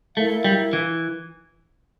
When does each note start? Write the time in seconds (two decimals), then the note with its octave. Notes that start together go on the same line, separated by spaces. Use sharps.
0.17 A3 E4 A#4 F5
0.44 G3
0.73 E3